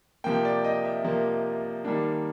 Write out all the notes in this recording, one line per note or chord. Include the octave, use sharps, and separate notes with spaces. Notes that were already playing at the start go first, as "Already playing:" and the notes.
C3 F3 A#3 G5
D5
D#5
E5
C3 F3 A#3
D#3 G3 A#3 D4